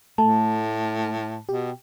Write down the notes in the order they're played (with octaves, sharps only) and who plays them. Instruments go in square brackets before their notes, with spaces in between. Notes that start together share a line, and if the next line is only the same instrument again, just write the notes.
[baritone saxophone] A2 [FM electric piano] A3 [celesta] A5
[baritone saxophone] B2 [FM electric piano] G4